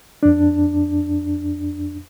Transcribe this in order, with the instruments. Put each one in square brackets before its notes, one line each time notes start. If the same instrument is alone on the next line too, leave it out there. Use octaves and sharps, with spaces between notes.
[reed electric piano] F2 D4